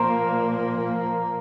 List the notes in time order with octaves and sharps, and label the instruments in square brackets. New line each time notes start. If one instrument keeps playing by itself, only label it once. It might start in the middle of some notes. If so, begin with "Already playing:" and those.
Already playing: [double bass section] A#2 F3 A#3 [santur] A#4 C5